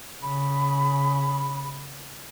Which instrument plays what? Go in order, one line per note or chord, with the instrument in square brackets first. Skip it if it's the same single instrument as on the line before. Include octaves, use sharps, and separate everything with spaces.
[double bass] C#3 [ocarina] B5